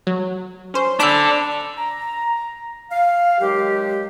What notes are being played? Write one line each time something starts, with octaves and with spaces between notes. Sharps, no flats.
F#3
C#4 C5
D4 A4 B5 D6 G6
A#5
F5
D#2 F#3 G#3 G4